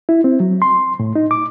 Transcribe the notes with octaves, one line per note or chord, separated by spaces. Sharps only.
E4
C4
F#3
C6
A2
D#4
D6